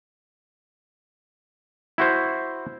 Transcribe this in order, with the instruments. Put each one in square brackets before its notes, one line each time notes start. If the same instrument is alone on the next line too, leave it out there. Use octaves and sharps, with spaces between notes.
[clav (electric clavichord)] E4 F#4 C5